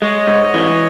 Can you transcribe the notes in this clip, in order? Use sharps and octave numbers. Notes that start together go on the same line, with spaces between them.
G#3 C#5 D#5
G#2
E3